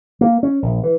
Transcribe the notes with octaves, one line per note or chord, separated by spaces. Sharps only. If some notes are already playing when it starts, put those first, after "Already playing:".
A#3
C#4
A#1
E3